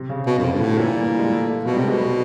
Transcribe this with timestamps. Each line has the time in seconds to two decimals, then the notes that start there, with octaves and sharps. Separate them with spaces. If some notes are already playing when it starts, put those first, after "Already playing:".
Already playing: C3
0.09 C#3
0.27 B2
0.38 F#2
0.44 F2
0.53 G2
0.61 A2 D3
0.79 A#2 E3
0.96 G3
1.07 G3
1.19 G#3
1.31 A3
1.48 A#3
1.65 B2 A3
1.71 G3
1.76 C3 G#3
1.88 B2 G#3
2.00 G3